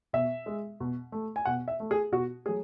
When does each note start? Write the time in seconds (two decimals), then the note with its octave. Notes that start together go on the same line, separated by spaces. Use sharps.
0.13 B2 E5
0.46 G#3
0.80 B2
1.12 A3
1.36 G#5
1.45 B2 F#5
1.68 E5
1.80 A3
1.91 G#4
2.12 B2 F#4
2.45 F#3 A3 G#4